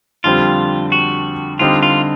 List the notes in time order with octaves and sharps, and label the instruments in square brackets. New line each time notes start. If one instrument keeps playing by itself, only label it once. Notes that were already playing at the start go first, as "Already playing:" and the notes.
[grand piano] F2 D3 G3 C4 [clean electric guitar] F4
[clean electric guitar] F#4
[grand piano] D3 G3 C4 D#4 G4 [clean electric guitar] F4
[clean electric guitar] F4